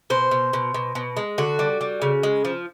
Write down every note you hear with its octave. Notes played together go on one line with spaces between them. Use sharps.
B2 C5
B2
B2
B2
B2
G#3
D3 F#4
G3
G3
C#3
G#3
F3